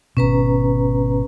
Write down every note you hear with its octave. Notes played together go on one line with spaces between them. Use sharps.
G#1 B2 C#4 B4 A#5